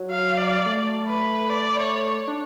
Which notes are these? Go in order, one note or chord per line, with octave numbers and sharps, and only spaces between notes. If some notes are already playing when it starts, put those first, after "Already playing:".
Already playing: F#3
F5
D5
A3
B4
D5
C#5
D4